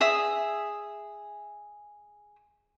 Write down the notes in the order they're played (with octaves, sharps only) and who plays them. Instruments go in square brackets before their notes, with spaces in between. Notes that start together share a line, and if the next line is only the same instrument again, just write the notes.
[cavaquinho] G#4 E5 D#6